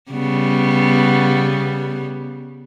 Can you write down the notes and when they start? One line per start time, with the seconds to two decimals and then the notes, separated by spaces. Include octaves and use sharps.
0.11 C#3 G3 B3